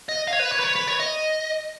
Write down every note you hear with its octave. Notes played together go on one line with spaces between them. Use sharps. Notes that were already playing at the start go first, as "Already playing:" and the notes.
D#5
F5
C#5
B4
C#5
B4
C#5
B4
C#5
D#5